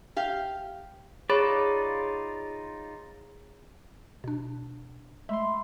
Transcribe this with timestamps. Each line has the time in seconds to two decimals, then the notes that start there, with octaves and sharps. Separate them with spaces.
0.17 G4 F5
1.30 D#4 F4 G#4 C#5 D5 B5
4.24 B2 D4
5.29 G#3 A3 E5 B5 C6